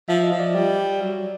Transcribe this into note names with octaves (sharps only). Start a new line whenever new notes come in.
F3 E5
D#5
F3
D5
G3 D5
F#3